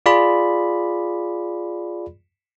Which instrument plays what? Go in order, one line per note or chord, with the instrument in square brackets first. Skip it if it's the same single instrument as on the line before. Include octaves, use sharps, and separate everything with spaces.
[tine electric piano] F4 G#4 D5 B5